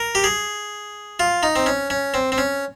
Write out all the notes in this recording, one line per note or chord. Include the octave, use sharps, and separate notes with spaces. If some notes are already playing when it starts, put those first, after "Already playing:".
Already playing: A#4
G4
G#4
F4
D#4
C4
C#4
C#4
C4
C4
C#4